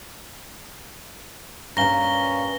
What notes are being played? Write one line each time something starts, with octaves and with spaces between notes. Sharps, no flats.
G2 A#2 C#4 F5 A#5 A#6 G7